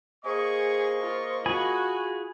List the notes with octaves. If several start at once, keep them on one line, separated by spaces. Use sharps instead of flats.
A#3 G#4 C5 D#5 C#6
F4
F4 F#4 G#4 G#5 B5